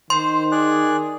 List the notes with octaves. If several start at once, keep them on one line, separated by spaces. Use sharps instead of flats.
D#3 C5 C6
G#4 D5 F#6